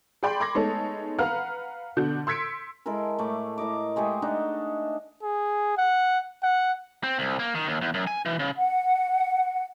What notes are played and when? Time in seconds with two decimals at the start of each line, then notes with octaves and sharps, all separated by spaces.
0.23 G#4 D5 G5 B5 C6
0.40 B5 C6 D6 G#6 A#6
0.55 G#3 A3 B3 D#4 A4 C#5
1.19 B4 F5 F#5 A#5 F6
1.97 B2 D3 D4 F#4 G6
2.27 C6 E6 G#6 B6 C#7 D7
2.86 G#3 E4 A4 A#4
3.19 A2 A3 D6
3.58 A2 A#4 D#5 D6
3.96 G#3 A3 G4 G#4
4.22 D4 D#4 D#5 F#5
5.23 G#4
5.78 F#5
6.43 F#5
7.03 C4
7.19 C2
7.39 A#3
7.55 D#3
7.68 D#2
7.81 E2
7.94 F#2
8.07 G#5
8.26 E3
8.39 C#3
8.57 F#5